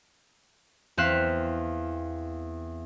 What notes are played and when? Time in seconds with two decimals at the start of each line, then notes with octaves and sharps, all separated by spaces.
0.97 E2 C4 F5 F#6 B6 E7